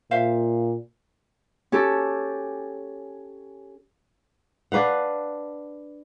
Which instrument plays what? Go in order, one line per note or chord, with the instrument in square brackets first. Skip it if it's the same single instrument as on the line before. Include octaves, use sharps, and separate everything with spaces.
[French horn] A#2 [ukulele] C5 E5 F5
[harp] C#4 G4 A4
[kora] D4 B4 F5 F#5